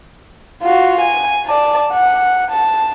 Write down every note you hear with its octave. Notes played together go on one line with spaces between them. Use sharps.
F4 F#4
G#5
D5 A5
F#5
A5